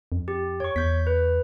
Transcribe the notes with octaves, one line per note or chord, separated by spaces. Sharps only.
F2
G4
C#5 C#6
E2 G6 B6
B4